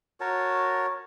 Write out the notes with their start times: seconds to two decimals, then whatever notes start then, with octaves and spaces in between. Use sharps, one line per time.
0.20 F#4 A#4 C#5 A5